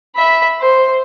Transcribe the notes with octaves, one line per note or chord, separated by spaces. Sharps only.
E5 B5
C5